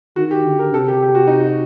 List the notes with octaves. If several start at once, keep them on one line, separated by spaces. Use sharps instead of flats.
D#3 F#4
G4
D3
A#4
C3 A4
G4
G4
F#4
D#4
F#4